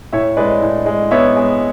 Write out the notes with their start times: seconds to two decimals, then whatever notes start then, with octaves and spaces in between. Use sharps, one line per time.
0.13 A2 C#5 E5
0.37 G#3 B4 D5
0.62 A2
0.86 G#3
1.11 B3 C#5 E5
1.36 G#3